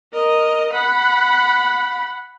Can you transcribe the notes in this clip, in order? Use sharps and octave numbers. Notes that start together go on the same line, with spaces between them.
A#4 D#5
F#5 B5